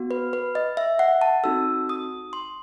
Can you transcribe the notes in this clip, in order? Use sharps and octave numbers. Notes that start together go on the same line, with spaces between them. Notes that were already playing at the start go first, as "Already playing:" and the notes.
Already playing: B3 F#4
B4
B4
D#5
E5
F#5
A5
C4 D#4 F#4 A4 E6
D#6
C6